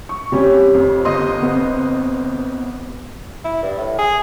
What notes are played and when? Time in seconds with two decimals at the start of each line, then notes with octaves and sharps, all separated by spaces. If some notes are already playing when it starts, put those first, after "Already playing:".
0.09 C#6
0.32 C3 G3 C#4 G4 C#5
0.74 F2
1.05 G1 D#5 C6
1.43 B3 C4
3.44 E4
3.63 G2
3.78 A2
3.98 G#4